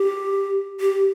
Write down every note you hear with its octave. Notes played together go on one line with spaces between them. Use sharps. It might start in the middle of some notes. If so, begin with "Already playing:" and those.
Already playing: G4
G4